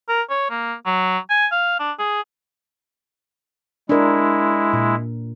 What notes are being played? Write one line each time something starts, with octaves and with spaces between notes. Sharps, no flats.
A#4
C#5
A#3
F#3
G#5
F5
D4
G#4
G#3 D4 E4 A#4
A#2